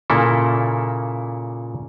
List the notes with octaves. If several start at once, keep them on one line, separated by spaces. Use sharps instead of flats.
A#2 C#3 A#3 E4 A4